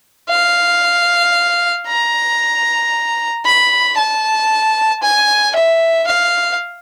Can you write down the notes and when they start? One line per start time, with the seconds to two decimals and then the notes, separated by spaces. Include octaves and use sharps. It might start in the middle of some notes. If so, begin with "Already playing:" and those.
0.29 F5
1.87 A#5
3.45 B5
3.98 A5
5.02 G#5
5.55 E5
6.07 F5